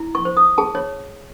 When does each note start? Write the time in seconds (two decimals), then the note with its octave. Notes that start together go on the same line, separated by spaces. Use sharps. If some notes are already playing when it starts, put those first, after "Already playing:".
Already playing: E4
0.15 C#6
0.25 C5
0.37 D#6
0.58 G#4 A5
0.75 C#5